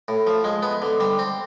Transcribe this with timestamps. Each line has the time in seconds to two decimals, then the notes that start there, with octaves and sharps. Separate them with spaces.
0.08 A2
0.27 F3
0.44 G#3
0.63 B3
0.82 D3
1.00 G3
1.19 C4